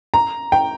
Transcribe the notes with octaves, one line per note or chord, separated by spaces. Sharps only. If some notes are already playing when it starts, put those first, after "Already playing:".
A#5
G5